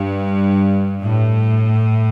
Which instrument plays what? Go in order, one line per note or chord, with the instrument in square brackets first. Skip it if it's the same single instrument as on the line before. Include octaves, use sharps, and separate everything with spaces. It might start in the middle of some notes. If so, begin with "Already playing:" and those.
Already playing: [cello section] G2
A2